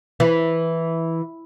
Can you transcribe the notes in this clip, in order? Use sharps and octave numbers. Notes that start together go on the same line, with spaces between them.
E3